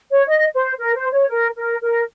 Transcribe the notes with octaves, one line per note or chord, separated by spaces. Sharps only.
C#5
D#5
C5
A#4
C5
C#5
A#4
A#4
A#4